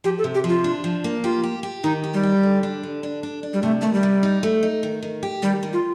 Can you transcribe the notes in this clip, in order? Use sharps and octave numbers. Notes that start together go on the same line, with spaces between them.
F3 G4
A4
C3
G4
F3 F4
D4
F3
A#3
F4 G4
G4
G4
D#3 D#4
G4
G3
G4
D3
D4
D3
D4
D4
D4
G3
C3 A3
D#3 A3
G3
C3
D#4
A3
D#4
D#3
D#3
G4
D#3 G3
D#3
F4